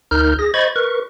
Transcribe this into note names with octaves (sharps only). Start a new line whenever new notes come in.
D2 D#4 A#4 F6 G6
G#4 A#6
C5 D#5 B5 C#6 G#6 A6
A#4 B4 C#6